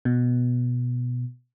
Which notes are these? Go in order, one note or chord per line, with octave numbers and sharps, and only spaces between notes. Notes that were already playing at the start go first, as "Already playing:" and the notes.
B2